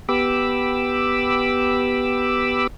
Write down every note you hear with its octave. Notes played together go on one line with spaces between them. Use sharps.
B3 G4 B5 D6 E6